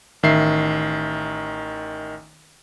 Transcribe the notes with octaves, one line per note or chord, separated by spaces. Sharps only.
A1 D#3 E5 C7